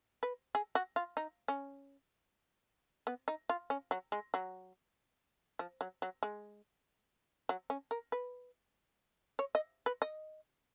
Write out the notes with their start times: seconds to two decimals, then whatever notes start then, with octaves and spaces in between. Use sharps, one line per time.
0.23 B4
0.55 G#4
0.75 F#4
0.96 F4
1.17 D#4
1.48 C#4
3.07 B3
3.28 D#4
3.50 F4
3.70 C#4
3.91 F#3
4.12 G#3
4.34 F#3
5.59 F3
5.81 F#3
6.02 F#3
6.23 G#3
7.49 F#3
7.70 C#4
7.91 A#4
8.12 B4
9.39 C#5
9.55 D#5
9.86 B4
10.02 D#5